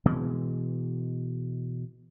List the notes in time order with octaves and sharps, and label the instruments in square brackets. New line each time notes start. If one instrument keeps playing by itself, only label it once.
[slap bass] B2 E3 G#3